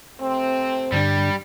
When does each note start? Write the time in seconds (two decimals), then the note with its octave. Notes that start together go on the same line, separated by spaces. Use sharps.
0.20 C3 A3 C4
0.92 G2 D3 G3 D4